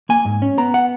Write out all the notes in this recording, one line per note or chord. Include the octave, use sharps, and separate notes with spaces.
A#3 G#5
G#2
C#4
B3 A#5
F#5